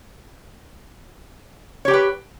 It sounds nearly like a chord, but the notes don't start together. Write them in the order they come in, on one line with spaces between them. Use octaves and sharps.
C#5 G4 G5 B4